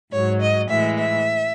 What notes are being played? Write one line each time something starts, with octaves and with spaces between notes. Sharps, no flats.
G#2 F#3 C#5
D#5
A2 E3 G#3 E5
E5